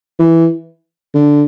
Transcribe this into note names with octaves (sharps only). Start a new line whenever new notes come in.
E3
D3